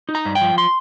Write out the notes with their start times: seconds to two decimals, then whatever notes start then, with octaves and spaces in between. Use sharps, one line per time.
0.09 D#4
0.15 A#5
0.25 G2
0.35 G5
0.41 F3
0.58 C6